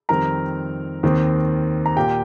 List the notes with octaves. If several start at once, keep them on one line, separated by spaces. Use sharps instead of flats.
F2 D#3 G3 C4 A#4 A#5
D#2 D#3 C4
A#5
A#2 A#3 G4 G5